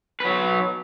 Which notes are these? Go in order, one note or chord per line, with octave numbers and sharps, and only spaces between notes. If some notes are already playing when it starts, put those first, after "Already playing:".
F#3 B4